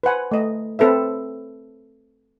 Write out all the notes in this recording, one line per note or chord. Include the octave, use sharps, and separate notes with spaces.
B4 C5 F#5 G#5
A3 D#5
C4 A4 B4 E5